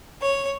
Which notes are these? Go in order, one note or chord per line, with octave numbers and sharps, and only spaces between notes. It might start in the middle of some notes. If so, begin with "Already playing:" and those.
C#5